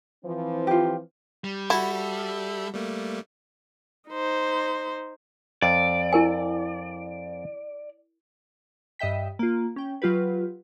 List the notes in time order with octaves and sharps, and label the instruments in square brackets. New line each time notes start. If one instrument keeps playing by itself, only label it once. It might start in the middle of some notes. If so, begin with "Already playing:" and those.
[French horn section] E3 F3 C4
[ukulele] F4 G4
[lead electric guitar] G3
[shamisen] E4 [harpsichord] F#4 A5 [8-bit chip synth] A4 E5
[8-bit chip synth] G3 A3 A#3
[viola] D#4 C5
[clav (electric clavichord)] F2 [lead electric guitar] D5
[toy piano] E4 A#4 G#5
[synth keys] G2 D#5 E5 G5 B6
A#3 F4
C#4 G5
F#3 F4 G4 B4